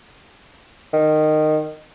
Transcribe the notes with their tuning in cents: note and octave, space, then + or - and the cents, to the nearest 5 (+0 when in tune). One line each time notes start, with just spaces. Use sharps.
D#3 -15